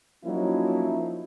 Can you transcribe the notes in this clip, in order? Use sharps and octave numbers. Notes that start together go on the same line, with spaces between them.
F3 F#3 A#3 C#4 D#4 E4